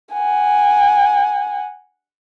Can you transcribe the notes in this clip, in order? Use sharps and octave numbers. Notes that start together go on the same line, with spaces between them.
F#5 G#5